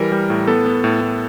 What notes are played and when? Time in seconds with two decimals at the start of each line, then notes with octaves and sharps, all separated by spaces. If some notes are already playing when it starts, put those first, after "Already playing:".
Already playing: E3 G3 A#4
0.12 G3
0.30 A2
0.47 B3 A4
0.66 B3
0.84 A2
1.01 A2